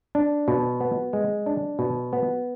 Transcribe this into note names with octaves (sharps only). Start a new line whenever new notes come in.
D4
B2
B3
G#3
D4
B2
B3